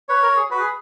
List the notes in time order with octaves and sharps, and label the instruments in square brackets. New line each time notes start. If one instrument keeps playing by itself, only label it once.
[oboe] B4 [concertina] C#5
[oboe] A#4
G#4
[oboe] F#4 [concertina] B4
[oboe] G#4